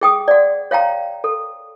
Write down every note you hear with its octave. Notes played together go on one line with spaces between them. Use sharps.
G#4 G5 D#6
D5 F#5
C#5 F5 G5 A#5
A4